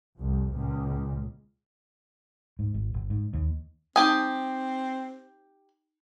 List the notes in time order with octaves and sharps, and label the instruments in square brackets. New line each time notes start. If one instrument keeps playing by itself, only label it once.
[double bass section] C2 F2
C#2 A#2
[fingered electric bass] G#2
G#1
G1
G#2
D#2
[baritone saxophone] C4 [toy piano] D#4 A5 D#6 [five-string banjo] G4 G#5